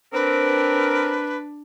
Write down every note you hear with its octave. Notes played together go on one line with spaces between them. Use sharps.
C4 D4 A#4 B4